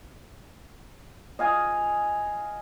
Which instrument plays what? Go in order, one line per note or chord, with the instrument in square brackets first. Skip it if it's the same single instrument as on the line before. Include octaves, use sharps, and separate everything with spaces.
[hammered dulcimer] D#5 F5 G#5